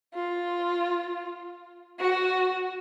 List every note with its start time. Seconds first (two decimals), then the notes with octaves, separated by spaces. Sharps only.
0.14 F4
1.99 F#4